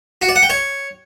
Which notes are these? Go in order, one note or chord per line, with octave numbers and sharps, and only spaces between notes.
F#4
D5
F#5
G5
C#5